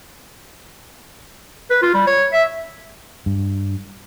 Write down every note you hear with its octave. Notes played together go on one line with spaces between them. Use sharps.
B4
F4
G3
C#5
E5
G2